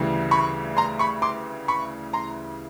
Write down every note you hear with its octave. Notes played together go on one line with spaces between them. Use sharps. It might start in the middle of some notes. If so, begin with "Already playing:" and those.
Already playing: D2 C#3 E3 G3
B5 C#6
A#5 C6
B5 C#6
C6 D6
B5 C#6
A#5 C6